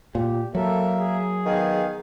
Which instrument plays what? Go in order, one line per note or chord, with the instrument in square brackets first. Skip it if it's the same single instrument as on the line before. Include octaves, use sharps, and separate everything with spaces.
[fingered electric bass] A#2 [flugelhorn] G4
[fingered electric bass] F#3 [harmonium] A#3 A#4 E5 [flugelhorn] A4
[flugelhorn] G#4
[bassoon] D#3 [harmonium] B3 F5